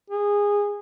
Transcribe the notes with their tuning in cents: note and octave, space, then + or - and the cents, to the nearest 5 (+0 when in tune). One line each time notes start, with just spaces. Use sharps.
G#4 -20